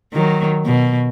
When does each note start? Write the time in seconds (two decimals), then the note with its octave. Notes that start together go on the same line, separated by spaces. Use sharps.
0.13 D#3 F#3
0.66 B2